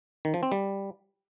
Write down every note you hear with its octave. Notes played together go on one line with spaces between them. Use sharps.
D#3
F3
C4
G3